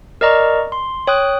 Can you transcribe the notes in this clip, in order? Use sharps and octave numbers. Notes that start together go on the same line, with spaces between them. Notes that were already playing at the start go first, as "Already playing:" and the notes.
A#4 D5 D#5 A#5 C#6
C6
C#5 G5 D#6 F#6